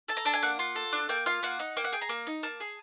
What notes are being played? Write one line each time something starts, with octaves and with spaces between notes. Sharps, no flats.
A4 A5
A#5
D4 A5
G#5
A#3 F#5
F4
A4
D4
A#3 G5
F4 F5
A#3 F#5
D#4
A#3 G5
F#5
G#4 G5
A#5
A#3
D#4
A#3 A5
G#4